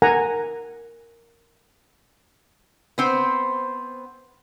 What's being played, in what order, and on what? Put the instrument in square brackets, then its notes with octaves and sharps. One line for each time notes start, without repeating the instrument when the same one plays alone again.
[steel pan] A#4 F#5 G#5 A#5
[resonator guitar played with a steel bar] B3 C4 C5